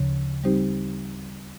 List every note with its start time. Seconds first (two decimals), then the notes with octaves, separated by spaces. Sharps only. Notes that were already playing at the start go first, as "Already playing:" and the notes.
Already playing: D2 C#3 F3
0.44 G3 C4 D#4 G4 C5